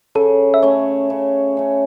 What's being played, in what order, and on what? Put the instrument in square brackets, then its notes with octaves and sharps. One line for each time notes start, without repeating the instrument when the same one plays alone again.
[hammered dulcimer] C#3 [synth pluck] A4
[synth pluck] E5
[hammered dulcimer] A3 C#4 [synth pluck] C#5
[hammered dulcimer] C#3
A3 C#4